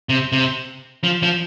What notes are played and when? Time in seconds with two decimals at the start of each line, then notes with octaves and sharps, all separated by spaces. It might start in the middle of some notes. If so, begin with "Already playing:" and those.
0.09 C3
0.32 C3
1.04 F3
1.23 F3